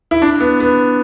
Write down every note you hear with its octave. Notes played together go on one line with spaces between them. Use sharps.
E4
D4
B3
B3